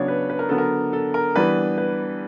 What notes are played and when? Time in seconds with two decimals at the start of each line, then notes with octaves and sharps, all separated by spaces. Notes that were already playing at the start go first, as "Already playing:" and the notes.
Already playing: C#3 F#3 B3 D4 C#5
0.08 B4
0.30 B4
0.39 A#4
0.49 D3 F#3 B3 D4 A4
0.58 A#4
0.93 A4
1.14 A#4
1.36 E3 G3 B3 D4 B4
1.78 B4